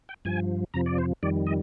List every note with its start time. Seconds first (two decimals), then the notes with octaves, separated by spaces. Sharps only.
0.09 G5
0.25 G2 F3 G#5
0.74 F2 C3 F3 A#5
0.86 D5
0.98 C5
1.23 F2 D#3 G3 D5
1.47 D#5